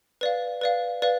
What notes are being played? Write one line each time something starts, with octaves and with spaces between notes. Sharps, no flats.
B4 D5 F5
B4 D5 F5
B4 D5 F5